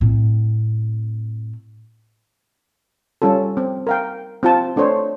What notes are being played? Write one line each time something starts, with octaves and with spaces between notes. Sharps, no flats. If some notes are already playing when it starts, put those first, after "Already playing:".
A2 C4
G3 C#4 F4 A4
C4
A#4 F5 G5
C4 F4 A5
A3 D4 A4 C5 C#5